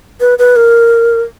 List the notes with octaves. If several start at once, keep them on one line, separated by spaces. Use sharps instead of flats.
B4
B4
A#4